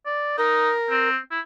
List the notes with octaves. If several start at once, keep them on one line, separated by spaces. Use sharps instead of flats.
D5
D#4 A#4
C4
E4